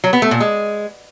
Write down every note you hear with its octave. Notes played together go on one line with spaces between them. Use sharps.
F#3
B3
A3
A#2
G#3